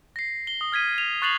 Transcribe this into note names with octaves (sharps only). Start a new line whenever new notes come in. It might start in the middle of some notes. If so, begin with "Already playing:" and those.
A#6 C7
G7
D#6
F6 G#6 B6 D#7
F7
C#6 F#6 A6 C7 F7 F#7